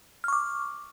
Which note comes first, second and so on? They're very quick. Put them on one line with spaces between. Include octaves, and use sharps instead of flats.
F6 C#6 D6